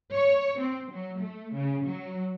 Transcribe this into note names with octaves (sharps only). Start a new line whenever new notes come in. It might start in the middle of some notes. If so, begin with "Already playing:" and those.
C#5
C4
F#3
A3
C#3
F#3